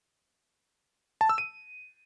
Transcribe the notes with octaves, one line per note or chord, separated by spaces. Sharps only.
A5
E6
D#7